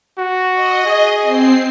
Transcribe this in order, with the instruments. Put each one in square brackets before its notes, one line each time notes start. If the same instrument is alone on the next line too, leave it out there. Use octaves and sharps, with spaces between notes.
[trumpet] F#4
[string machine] D#5
[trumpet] G#4
[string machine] C4 C7